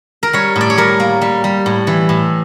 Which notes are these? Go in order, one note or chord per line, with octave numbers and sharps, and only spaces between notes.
A#4
G3 C#5
A2
D5
C#5
G3 A#4
A#3
G3
G3
A2
E3
A2